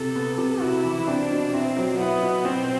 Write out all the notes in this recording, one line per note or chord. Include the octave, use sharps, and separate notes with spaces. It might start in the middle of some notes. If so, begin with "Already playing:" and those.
Already playing: C3 A4
B3
C3
E4 F#4
E3
C4 D4
B2
C4 E4
F#3
B3 E4
B2
B2 C4